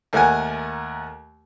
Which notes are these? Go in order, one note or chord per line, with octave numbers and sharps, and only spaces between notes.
D#2 A3 A#4 F#5 G#5